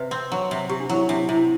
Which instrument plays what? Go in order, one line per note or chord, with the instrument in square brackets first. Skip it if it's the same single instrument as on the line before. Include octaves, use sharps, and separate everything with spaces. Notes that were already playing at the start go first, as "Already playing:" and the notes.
Already playing: [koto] C3 [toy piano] B4
[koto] C4
F#3
C3
[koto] C3 [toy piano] G4
[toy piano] D4
[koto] F#3 [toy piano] E4
[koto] C3 [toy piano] D4
[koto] C3 [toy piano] E4